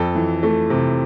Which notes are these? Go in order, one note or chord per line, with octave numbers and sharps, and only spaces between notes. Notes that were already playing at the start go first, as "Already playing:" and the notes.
Already playing: F2 A4
E3
A3
C3